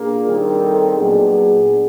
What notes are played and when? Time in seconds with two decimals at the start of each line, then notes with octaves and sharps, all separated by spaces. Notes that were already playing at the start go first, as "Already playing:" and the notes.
Already playing: A#2 A#3 D4 G#4
0.27 D#3 G3 C4 D#4
0.61 A4
0.94 A#2 F#3 B3 D4 G#4